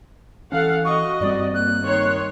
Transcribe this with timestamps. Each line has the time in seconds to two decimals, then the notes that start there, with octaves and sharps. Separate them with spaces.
0.52 E3 C#4 A4 F5 F#5
0.85 F#4 D#5 C#6
1.21 G2 G3 C4 D5
1.54 A#3 F#6
1.85 D#3 C#5 C6